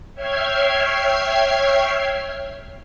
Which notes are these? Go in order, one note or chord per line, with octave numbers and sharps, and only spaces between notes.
C#5 E5 G5 F6 G#6 C7